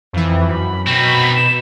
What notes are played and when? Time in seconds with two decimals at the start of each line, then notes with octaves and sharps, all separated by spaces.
0.13 F2 E3
0.48 F#2 B5
0.87 B2 C4 D#4 B5
1.36 E7